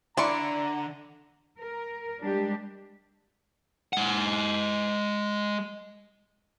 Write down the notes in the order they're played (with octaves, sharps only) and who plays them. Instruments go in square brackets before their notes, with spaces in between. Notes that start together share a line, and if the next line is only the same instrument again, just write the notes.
[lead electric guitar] D3 [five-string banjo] D4 E4 [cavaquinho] D5 C6 C#6 [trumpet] A#5
[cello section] A#4
G3 G#3 D4 G4
[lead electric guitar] G#3 F#5